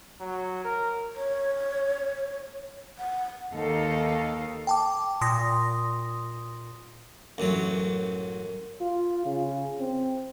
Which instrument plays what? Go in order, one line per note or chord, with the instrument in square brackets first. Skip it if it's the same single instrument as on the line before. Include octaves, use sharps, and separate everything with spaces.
[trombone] F#3
A#4
[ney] C#5
F#5
[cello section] D#2 D#3 D#4 A4 F5
[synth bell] G5 A5 D6
[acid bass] A#2 [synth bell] C6 D#6 A#6
[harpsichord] A1 F#2 E3 F#3
[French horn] F4
C#3
C4